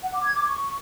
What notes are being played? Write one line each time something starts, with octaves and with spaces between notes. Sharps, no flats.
F#5
D6
G#6
D6
C#6